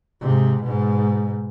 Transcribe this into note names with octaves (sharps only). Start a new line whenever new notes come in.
G#2 C3
G#2 B2